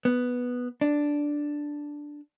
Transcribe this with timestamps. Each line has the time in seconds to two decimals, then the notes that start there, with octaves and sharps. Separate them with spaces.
0.05 B3
0.81 D4